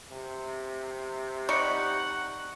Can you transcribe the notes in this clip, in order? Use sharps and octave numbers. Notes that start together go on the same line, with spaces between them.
C3
G3 D#4 F#5 C#6 C#7